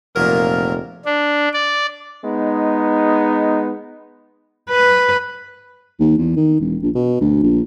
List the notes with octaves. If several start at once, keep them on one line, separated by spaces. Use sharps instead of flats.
F1 A#2 F3 F#3 A#4
D4
D5
G#3 B3 D#4
B4
D#2
E2
D#3
E1
A#1
B2
D2
A#1